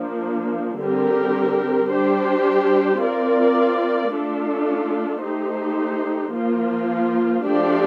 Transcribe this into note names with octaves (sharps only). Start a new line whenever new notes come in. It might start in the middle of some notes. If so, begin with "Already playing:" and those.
Already playing: F3 A#3 D4
D3 G3 C4 G4 A#4
G3 D4 G4 C5
C4 F4 A#4 D5
A3 D4 F4 A4
A3 D#4 G4 C5
F3 A#3 F4
F3 A3 D4 G4 D5